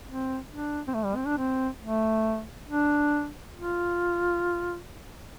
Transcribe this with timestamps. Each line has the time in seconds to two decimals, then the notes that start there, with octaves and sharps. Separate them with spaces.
0.07 C4
0.50 D4
0.87 C4
0.94 A3
1.05 G3
1.16 C4
1.27 D4
1.38 C4
1.81 A3
2.68 D4
3.55 F4